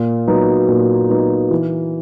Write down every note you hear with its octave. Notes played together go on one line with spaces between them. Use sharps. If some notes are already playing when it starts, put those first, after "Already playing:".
Already playing: A#2
F#3 B3 D#4
A#2
F#3 B3 D#4
E3